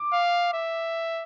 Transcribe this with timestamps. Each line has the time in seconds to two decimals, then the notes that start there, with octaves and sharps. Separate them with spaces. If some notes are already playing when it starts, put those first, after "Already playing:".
Already playing: D6
0.13 F5
0.54 E5